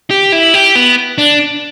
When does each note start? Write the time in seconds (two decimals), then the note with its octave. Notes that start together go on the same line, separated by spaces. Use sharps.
0.11 G4
0.32 E4
0.54 G4
0.75 B3
1.18 D4